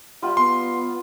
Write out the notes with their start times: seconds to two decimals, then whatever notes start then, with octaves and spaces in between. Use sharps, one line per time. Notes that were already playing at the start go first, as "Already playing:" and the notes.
0.22 G3 F4 E5
0.37 B3 C6